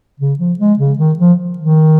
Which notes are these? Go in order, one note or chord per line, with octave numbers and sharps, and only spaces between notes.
C#3
F3
G#3
C#3
D#3
F3
D#3